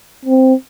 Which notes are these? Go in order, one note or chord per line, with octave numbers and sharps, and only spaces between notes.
C4